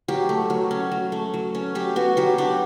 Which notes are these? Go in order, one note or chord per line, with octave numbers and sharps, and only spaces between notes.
F#3 G4
A3
F#3
C#4
F#3
A3
F#3
C#4
F#3 G4
B3 F#4
F#3 G4
D4 G4